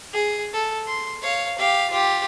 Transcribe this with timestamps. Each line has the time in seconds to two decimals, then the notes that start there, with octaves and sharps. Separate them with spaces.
0.13 G#4
0.53 A4
0.87 C6
1.22 C#5 F5
1.58 G4 F5
1.90 F4 G4